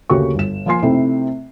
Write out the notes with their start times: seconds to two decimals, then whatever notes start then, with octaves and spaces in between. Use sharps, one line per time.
0.10 D2 C#3 A#3 F#4 G4 C#6
0.35 G1 E7
0.66 F3 A#3 F4 G#5 C6 C7
0.82 C3 A3 C4 D#4 E4